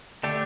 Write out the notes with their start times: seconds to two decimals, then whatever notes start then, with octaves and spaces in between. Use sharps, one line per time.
0.23 D3 A3 D4 G4